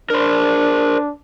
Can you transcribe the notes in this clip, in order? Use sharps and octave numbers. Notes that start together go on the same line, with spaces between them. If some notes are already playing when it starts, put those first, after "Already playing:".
D4 A#4 C5